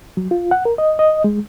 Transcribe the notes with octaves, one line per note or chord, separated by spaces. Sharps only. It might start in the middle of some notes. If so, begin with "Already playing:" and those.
F#3
F4
F#5
A#4
D#5
D#5
G#3